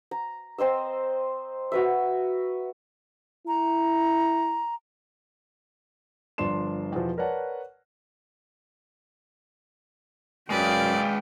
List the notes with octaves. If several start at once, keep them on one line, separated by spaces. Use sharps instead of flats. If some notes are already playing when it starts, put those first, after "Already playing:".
A#5
C4 C5 D#5 E6
F#4 B4 E5
E4 A#5
G1 F3 D4 C6 E7
E2 B2 F3
A#4 B4 C#5 D5 F#5 A5
F#2 G#3 B4 D5 F5 G5